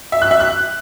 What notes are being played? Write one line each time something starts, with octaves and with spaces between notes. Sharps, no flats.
E5
F#6
E5
F#6